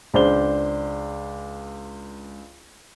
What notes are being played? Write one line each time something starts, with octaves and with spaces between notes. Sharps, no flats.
C#2 D4 C5 G7